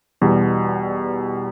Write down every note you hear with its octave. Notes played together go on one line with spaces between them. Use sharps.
E2 B2 G3